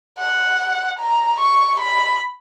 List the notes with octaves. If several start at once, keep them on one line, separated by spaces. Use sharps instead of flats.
F#5
A#5
C#6
B5